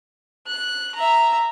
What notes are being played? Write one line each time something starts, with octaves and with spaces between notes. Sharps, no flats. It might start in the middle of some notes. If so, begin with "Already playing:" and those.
F#6
E5 A#5